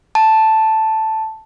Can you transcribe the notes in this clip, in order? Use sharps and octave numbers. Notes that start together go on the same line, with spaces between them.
A5